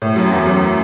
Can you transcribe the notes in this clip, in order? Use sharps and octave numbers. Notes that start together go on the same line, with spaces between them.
A2
F#2
E2
F#2